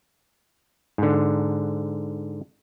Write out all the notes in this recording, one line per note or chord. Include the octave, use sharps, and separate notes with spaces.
G#2 D3